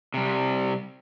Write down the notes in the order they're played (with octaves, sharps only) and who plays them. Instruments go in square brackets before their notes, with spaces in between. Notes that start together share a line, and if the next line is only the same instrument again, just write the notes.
[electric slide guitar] C3 G3